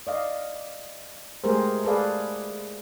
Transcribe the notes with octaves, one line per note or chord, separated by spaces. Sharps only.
D5 D#5 F5
G#3 A3 G4 G#4 A#4 C5
G#4 A4 B4 D5 F5